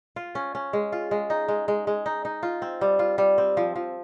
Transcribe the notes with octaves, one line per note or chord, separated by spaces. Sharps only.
F4
C#4
C#4
G#3
F4
G#3
D#4
G#3
G#3
G#3
D#4
D#4
F4
C4
G3
F4
G3
C4
F3
F3